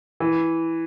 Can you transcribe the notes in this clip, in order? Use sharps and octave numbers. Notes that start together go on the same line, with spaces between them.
E3